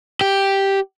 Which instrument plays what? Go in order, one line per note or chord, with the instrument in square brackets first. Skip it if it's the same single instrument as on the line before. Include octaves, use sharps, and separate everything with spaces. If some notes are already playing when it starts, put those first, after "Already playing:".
[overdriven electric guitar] G4